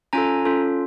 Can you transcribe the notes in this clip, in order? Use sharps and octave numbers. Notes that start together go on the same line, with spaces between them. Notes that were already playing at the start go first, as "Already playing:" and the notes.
C#4 F4 A4 G#5 A#5
C#4 F4 A4